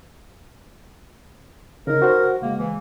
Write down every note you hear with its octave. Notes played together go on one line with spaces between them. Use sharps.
C#3 D#4 A#4
F#4 C5 F#5
C#2 G#3 A#3
E3